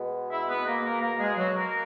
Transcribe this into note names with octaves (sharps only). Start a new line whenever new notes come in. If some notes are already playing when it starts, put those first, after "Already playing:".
Already playing: B2 G#3 B3
E4 E5
B3 B4
A#3 A#4
A#3 A#4
A#3 A#4
G#3 G#4
F#3 F#4
A#3 A#4